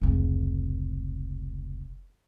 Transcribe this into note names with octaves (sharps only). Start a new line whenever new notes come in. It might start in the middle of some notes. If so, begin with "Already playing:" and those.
F1 C#2